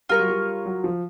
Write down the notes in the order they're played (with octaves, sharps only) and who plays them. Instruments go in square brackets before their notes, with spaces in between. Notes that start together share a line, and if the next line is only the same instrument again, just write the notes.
[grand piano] G3 [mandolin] F4 A#4 C#5
[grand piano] F#3
G3
F#3
F3